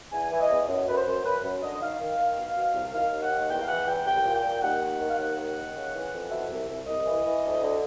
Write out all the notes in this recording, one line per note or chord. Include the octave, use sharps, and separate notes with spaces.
E2 G#5
E3
D#5
E2
F#2
F#2 B4
C5
F#2
F#2 B4
F#2
D3 D#5
D#3 F5
D#3
D#3
B2
B2
C2
D#3 F5
D#2
F#5
D#3
E2 G5
F5
E3 F#5
E2 G5
C2 G5
A#2
G5
A#2
D#2 F#5
D#3
D#3
F5
D#2 F#5
D#3
D#3
C#3
E3
F2
B2 E5
C2
C2
C2 D#5
E3
E3
D2
D3